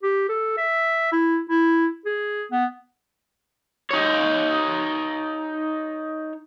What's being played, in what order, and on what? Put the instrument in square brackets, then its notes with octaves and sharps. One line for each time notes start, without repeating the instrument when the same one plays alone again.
[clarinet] G4
A4
E5
E4
E4
G#4
B3
[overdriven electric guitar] D#4 C#5